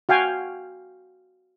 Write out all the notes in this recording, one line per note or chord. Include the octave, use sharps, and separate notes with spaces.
F#4 F5 G5 G#5